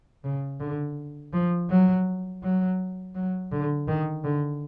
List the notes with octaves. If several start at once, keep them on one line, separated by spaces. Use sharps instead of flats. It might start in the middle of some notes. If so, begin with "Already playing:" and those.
C#3
D3
F3
F#3
F#3
F#3
D3
D#3
D3